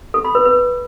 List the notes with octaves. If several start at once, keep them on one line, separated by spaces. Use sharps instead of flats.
A4
B5
B4
B4